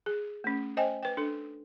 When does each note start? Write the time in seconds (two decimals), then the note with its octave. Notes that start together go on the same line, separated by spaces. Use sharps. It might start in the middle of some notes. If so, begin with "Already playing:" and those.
0.06 G#4
0.44 A3 C#4
0.77 C5 D#5 G5 G#5
1.03 B4 G5
1.17 D4 A4